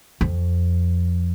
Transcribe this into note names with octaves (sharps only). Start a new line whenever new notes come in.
F2